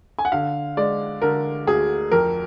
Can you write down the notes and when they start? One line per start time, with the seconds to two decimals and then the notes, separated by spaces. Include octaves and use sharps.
0.19 G#5
0.25 F#5
0.32 D3 F5
0.77 G#3 D5
1.22 D3 A#4
1.67 D2 G#4
2.11 F2 A#4